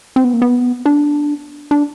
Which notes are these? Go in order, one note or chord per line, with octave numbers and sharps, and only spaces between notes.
C4
B3
A#3
B3
D4
D4